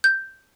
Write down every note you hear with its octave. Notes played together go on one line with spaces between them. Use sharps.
G6